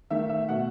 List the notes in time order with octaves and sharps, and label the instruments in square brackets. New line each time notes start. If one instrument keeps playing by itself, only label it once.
[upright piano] D#3 A3 E5
E5
B2 A3 F#5